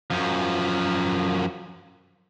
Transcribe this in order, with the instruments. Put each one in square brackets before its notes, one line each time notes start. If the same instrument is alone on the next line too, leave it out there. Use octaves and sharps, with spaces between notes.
[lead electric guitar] F#2 F3